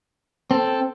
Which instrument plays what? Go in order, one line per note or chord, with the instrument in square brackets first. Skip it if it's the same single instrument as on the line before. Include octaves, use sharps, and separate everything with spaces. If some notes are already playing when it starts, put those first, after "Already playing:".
[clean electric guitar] C4 [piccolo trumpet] A4